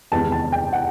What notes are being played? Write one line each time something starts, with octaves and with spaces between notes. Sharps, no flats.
E2 C3 D#3 G#3 B3 A5
A5
G5
F#5